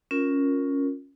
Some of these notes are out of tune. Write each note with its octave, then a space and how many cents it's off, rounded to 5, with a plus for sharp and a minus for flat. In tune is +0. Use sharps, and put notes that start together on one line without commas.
C#4 +0 F4 +15 A#4 +0